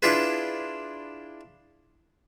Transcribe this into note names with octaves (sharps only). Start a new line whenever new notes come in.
D4 E4 F4 G#4 B4